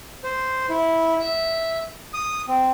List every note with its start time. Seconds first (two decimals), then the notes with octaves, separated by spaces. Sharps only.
0.24 C5
0.69 E4
1.20 E5
2.14 D#6
2.48 C4